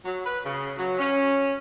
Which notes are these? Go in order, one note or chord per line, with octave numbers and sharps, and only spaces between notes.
F#3
B4
C#3
F#3
C#4